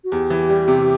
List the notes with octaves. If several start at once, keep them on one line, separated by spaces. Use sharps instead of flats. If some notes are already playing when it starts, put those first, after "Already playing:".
F#4
E2 G4
E3
G3
C3